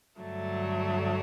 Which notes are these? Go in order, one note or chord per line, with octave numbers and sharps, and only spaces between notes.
G2 D3 F#3 A3